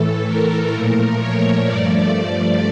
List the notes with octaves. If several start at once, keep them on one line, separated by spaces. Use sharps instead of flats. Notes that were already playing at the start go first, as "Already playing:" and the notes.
Already playing: A2 E3 A3 A4
A#4
A#2 F3 A3
C#5
G2 F3 A3 D5